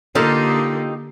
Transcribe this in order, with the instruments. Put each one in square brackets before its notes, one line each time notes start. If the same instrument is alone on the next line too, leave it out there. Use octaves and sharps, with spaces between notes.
[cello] D3 A#3 [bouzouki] D#4 G4 [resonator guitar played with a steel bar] F4 A4 A#4